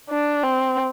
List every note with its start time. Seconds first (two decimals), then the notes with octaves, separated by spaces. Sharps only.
0.10 D4
0.43 C4